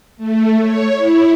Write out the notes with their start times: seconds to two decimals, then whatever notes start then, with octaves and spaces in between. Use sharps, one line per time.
0.17 A3
0.60 C#5
0.94 E4